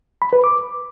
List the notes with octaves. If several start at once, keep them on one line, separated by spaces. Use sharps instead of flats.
B5
B4
D6